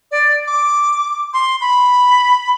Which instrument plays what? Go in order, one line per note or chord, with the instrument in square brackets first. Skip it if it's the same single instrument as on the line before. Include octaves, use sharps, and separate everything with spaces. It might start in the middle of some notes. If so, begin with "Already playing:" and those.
[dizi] D5
D6
C6
B5